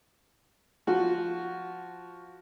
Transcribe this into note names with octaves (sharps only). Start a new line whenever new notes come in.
F3 F#4